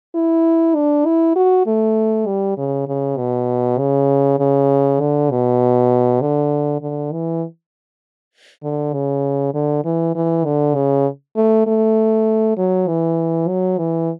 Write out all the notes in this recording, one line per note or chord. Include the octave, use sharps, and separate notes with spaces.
E4
D4
E4
F#4
A3
G3
C#3
C#3
B2
C#3
C#3
D3
B2
D3
D3
E3
D3
C#3
D3
E3
E3
D3
C#3
A3
A3
F#3
E3
F#3
E3